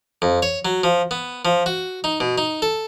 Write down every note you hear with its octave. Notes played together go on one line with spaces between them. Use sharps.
F2
C#5
F#3
F3
B3
F3
F#4
D#4
B2
D#4
A4